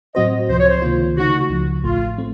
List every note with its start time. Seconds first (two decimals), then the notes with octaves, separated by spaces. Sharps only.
0.15 A2 F#3 C4 F#4 C5 D#5
0.49 C#2 C3 F3 C5
0.58 C#5
0.68 C5
0.82 C#2 C3 D#3 A#3 F4
1.16 C#3 A3 D#4 F#4
1.50 C#2 C#3 F3
1.84 A1 A2 A3 F4
2.18 A3 C4